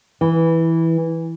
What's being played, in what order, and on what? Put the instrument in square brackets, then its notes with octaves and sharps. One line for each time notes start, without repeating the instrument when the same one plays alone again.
[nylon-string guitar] E3